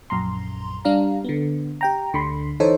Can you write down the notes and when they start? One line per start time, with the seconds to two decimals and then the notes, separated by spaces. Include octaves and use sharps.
0.10 A#1 F#2 A#5 C6
0.85 G3 D4 F5 A#5
1.24 D3 B3
1.81 G4 G5 A#5
2.13 D2 D3 B5 C6
2.60 E3 D#4 A4 C5 C#5